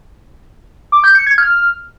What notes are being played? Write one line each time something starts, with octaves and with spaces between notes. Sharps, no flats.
D6
G6
C#7
G#6
F6